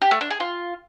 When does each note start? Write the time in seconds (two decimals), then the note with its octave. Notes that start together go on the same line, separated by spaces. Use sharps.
0.02 G4
0.11 A3
0.21 D4
0.30 G#4
0.40 F4